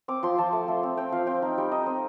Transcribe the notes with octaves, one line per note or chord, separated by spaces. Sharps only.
C4 D6
F3 C6
F3 A5
A3
A3
C4
C4 G5
F3 F5
C4 G5
D#4 F5
G3 G5
D#4 D#5
C4